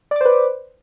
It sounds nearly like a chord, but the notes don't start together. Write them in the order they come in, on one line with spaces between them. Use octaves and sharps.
D5 D6 C5 B4